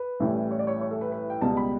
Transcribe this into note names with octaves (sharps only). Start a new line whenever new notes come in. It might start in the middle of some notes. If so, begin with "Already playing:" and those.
Already playing: B4
A1 A2 E3 G3
C#5
D5
C#5
C#5
A4
B4
B4
G5
C#2 B2 G3 A5
B5